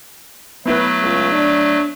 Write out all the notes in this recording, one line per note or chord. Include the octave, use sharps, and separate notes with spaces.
F#3 A3 B3 E4 B4
C#2
D4